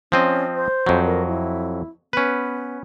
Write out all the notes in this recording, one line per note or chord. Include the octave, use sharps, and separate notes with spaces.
F3 C4 C#4 D#5
C5
F2 F#3
A#4
E4
B3 C#4 B4